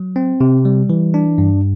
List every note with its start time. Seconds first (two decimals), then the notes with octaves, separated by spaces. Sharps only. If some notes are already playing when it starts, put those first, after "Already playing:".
Already playing: F#3
0.16 C4
0.41 C3
0.65 G3
0.90 E3
1.14 D4
1.38 G2